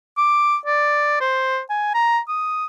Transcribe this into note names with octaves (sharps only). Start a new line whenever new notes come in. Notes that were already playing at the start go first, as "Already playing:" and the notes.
D6
D5
C5
G#5
A#5
D#6